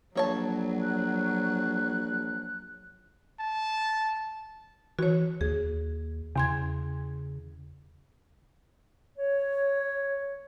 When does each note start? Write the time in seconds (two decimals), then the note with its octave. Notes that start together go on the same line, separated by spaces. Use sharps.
0.15 A#1 F#3 G3 C#5 A5
0.82 F#6
3.40 A5
4.99 E3 F#4 C#5
5.41 D#2 G#4
6.36 E2 C#3 C6 G#6
9.18 C#5